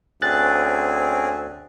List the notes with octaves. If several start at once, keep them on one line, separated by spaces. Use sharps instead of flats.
D2 C4 C#4 G#4 F#6 A6